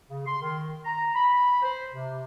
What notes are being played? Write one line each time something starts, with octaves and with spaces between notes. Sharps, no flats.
C#3
C6
D#3
A#5
B5
C5
C3